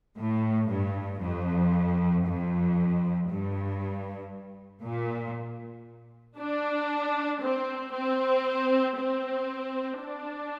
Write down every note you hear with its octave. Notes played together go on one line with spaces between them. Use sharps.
A2
G2
F2
F2
G2
A#2
D4
C4
C4
C4
D4